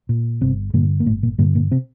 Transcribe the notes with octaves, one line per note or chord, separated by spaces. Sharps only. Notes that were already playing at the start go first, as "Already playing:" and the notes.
A#2
G1 C3 C4
G2 A#2 D3 A#3
A#3
G1 A2 A3
A#2 A#3
G2 A#2 D3 A#3
A#2 A#3
C3 C4